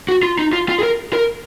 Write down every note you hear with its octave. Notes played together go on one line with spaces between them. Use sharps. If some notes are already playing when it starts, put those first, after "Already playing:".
F#4
F4
D#4
F4
F4
G#4
A#4
A#4